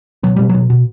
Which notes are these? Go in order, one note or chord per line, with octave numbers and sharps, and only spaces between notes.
B2 F#3
B2 G3
B2 F#3
B2